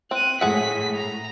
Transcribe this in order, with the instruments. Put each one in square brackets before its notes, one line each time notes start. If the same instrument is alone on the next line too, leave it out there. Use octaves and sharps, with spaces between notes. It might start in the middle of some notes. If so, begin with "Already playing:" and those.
[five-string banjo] C4 [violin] F#6 D#7
[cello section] A2 [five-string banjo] G#4 F#5 [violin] B6
[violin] A#5